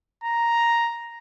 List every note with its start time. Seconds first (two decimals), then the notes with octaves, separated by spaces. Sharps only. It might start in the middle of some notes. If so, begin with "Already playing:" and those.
0.24 A#5